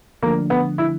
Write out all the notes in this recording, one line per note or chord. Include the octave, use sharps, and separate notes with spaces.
D3 F3 A3 A#3 D4
B3
E4